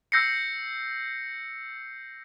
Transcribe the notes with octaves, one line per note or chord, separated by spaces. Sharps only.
E6 G6 A#6 C7 C#7